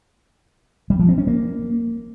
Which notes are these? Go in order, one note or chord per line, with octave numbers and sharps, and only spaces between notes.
G3
F3
C4
C#4
A#3